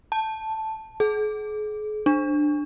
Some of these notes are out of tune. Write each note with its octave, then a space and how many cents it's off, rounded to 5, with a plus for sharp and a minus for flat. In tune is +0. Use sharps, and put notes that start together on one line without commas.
A5 +0
G#4 +40
D4 +15